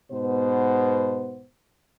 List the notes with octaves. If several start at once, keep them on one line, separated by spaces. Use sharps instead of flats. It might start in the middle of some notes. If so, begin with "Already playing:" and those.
G#2 B2 B3 C5